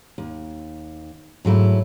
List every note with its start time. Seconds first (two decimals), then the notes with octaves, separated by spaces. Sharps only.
0.18 D#2
1.45 G#2 F#3 A3 E4